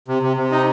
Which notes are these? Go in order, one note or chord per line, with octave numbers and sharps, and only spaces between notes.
C3
C3
C3
D#4